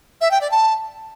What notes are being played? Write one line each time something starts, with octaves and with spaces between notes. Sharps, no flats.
E5
G5
D5
A5